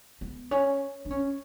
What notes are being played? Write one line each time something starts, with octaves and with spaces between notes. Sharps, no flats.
B3
C#4
D4
C#4